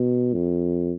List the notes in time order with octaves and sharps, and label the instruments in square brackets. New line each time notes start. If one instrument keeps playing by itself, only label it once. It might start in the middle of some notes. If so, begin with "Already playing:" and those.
Already playing: [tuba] B2
F2